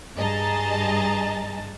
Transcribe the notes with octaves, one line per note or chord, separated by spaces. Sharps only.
G2 G#4 D#5 A5 A#5 A6